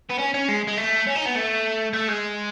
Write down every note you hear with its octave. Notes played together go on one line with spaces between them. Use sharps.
B3
C#4
C#4
G#3
G#3
A3
C#4
D#4
B3
A3
A3
G#3